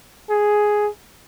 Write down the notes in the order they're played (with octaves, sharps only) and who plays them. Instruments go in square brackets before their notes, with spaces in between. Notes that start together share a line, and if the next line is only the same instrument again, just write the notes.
[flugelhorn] G#4